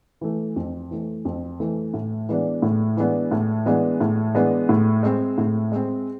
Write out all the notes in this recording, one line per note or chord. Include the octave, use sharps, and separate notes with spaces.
E3 A3
F2
E3 A3
F2
E3 A3
A2
E3 G#3 B3 D4
A2
E3 G#3 B3 D4
A2
E3 G#3 B3 D4
A2
E3 G#3 B3 D4
A2
G#3 C4
A2
G#3 C4